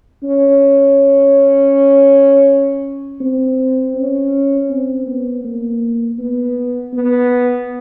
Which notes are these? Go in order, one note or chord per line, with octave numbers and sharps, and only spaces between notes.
C#4
C4
C#4
C4
B3
A#3
B3
B3